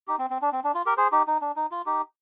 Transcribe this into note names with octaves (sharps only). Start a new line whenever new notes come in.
D#4 G4
C4
C4
D4
C4
D4
F4
G4 A#4
G#4 C5
D#4 G4
D#4
D4
D#4
F4
D#4 G4